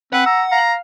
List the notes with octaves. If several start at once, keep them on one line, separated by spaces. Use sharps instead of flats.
C4 B4 F#5
A#5 E6
F5 A#5